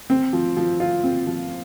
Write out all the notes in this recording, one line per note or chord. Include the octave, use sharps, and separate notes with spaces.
C4
F3
F3
F4
C4
F3